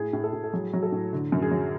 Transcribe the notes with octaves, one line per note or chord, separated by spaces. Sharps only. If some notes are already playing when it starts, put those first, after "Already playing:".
Already playing: A2 G#4
A2
A4
A2
A4
F#3 G#4
F#3
A4
A2
D3
F#2
G#4
F#3